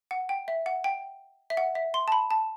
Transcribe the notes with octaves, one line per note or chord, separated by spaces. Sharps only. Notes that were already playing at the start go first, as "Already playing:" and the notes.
F#5
G5
E5
F#5
G5
E5
F#5
E5
C6
A5
B5
A5